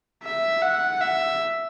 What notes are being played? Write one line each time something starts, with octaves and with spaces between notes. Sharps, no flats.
E5
F#5
E5